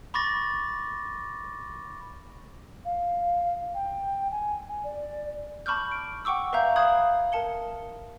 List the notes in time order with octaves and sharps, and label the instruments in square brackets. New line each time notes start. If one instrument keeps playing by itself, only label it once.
[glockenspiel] B5 C#6 D6 A6 A#6
[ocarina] F5
G5
G#5
D5
[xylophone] A5 B5 C#6 D6 F6 G6
D7
F#5 G5 C#6 D6 E6
B4 E5 F5 A#5 G6
F5 B5 D#6 F#6 G#6 F#7
A#4 A5 C#7 G7